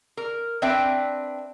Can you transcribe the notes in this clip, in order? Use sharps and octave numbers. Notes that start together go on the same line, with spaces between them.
A#4
C4 D4 B4 E5 G5 A5